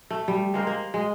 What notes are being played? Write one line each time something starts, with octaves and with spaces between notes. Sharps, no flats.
A3
G3
G#3 A#3 A#4 C5
A#3
G#3